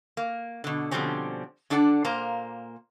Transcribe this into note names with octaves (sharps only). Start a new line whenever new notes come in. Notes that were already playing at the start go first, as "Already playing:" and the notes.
A#3
B2 D3
B2 D3 F3 G3 C4 C#4
D3 D4 A4 D5 F#5
A#2 A#3 C5 A#5